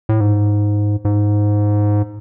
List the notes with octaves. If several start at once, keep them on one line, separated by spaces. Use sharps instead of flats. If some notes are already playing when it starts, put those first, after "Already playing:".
A2
G#2
G#2